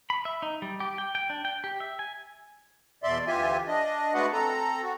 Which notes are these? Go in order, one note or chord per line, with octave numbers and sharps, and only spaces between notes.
B5
E5
D#4
G3
G4
G5
G5
D4
G5
G4
E5
G#5
E2 B2 D5 E5 C6
D2 E3 F4 G4 E5 G#5
D4 D#5
G#3 A3 D4 F#4 B4 F#5
C4 A4 A#5
F#4